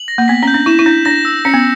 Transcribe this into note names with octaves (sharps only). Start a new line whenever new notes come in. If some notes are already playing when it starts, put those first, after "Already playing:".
Already playing: F#7
A#6
A#3
B3 B6
C#4 G6
D4
E4 E7
E4
D4 G6
D4 A#6
E6
C#4 C#7
B3